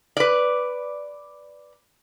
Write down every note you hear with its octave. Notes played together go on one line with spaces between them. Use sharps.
B4 D5